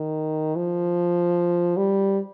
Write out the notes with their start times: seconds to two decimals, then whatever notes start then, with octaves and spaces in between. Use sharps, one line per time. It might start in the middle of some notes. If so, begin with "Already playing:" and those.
Already playing: D#3
0.56 F3
1.77 G3